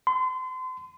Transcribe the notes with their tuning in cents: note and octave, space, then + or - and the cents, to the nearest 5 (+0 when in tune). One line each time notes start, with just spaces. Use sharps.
C6 -35